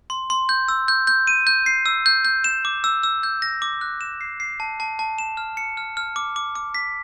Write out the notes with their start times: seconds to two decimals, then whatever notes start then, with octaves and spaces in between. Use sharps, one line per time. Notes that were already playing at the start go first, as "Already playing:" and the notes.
0.10 C6
0.30 C6
0.49 G6
0.68 E6
0.88 G6
1.07 G6
1.27 D#7
1.47 G6
1.66 C7
1.86 E6
2.06 G6
2.25 G6
2.44 E7
2.65 D6
2.84 E6
3.03 E6
3.23 G6
3.42 A#6
3.62 D6
3.81 F#6
4.01 E7
4.21 C7
4.40 C7
4.60 A5
4.80 A5
4.99 A5
5.18 E7
5.37 F6
5.57 C#7
5.77 F6
5.97 F6
6.16 D6
6.36 D6
6.56 D6
6.75 B6